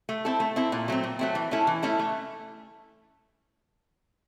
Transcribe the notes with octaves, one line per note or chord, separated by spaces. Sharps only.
A3
C4 E4 A4
A3
C4 E4 A4
A#2
F#3 A3 C4
A#2
F#3 A3 C4
E3
A3 C#4 E4 A4
E3
A3 C#4 E4 A4
A3